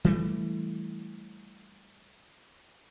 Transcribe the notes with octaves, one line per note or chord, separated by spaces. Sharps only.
E3 G3 A3